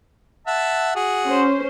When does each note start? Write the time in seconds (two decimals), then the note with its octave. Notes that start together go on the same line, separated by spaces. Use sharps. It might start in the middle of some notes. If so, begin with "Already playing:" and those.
0.47 E5 F#5 A5
0.96 F#4 G#4
1.26 C#4 C5